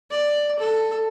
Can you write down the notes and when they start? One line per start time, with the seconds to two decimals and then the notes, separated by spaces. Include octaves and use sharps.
0.11 D5
0.59 A4